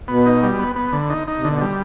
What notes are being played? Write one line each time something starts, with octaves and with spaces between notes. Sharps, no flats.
B2 B3
D#4
G3
B3
B3
D3
D#4
D#4
C3
B2 D3
G3